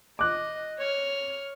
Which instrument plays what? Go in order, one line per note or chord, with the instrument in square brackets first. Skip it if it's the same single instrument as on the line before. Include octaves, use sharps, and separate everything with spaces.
[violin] D#5 [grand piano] D6 F#6
[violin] C#5 F6